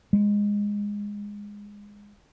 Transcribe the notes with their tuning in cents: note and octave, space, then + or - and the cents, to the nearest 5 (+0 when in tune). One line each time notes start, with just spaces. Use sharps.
G#3 -15